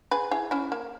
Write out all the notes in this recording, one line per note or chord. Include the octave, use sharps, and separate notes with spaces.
G#4 B4
E4 G#4
C#4 E4
A#3